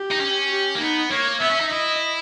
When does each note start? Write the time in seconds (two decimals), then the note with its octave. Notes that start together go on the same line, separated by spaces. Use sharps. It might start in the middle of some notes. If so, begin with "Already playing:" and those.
Already playing: G4
0.12 D#4
0.21 C#4
0.51 G4
0.75 A#3
0.81 B3 D#4
1.11 A#3 C#5
1.40 B3 E5
1.51 C#4
1.61 D#4
1.71 E4 D#5